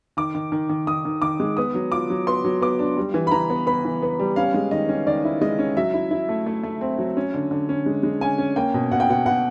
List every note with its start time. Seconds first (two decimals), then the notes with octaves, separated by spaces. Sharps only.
0.17 D#3 D6
0.35 D#3
0.52 D#3
0.69 D#3
0.87 D#3 D#6
1.05 D#3
1.22 D#3 D6
1.40 G#3
1.57 B3 D#6
1.75 F#3
1.92 F4 D6
2.10 F#3
2.27 B3 C6
2.44 F#3
2.61 B3 D6
2.79 D4
2.97 G3
3.14 E3
3.27 B5
3.31 E3 A#5
3.50 B3
3.67 B3 B5
3.85 E3
4.02 B3
4.20 G3
4.36 C#4 F5
4.54 G#3
4.71 D#3 D#5
4.89 C#4
5.06 D#3 D5
5.24 E4
5.41 G#3 D#5
5.59 C#4
5.77 F#3 E5
5.94 E4
6.11 E4
6.29 A3
6.46 A3
6.63 A3
6.81 C4
6.98 F#3
7.17 C#4
7.34 D3
7.51 D3
7.69 C#4
7.86 G#3
8.03 G#3
8.21 C#4 G#5
8.38 C#4
8.56 A#3 G5
8.74 B2
8.91 B2 F#5
9.00 G5
9.09 B2 F#5
9.26 B2 F#5